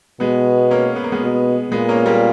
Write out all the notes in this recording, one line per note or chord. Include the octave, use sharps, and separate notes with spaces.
B2 G#3 B3
A#3 C#4
B3
A#3
G#3 B3
B2
A#2 G#3 B3
A#3 C#4
G3 A#3